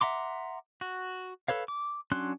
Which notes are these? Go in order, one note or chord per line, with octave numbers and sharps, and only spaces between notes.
E5 F#5 A#5 C6 D6
F#4
A4 B4 C#5 F5
D6
F#3 C#4 D4 C6 F#6